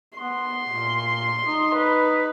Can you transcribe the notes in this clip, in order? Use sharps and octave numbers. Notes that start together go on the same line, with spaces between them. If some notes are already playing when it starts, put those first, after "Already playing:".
B3 C6
A#2
D#4
B4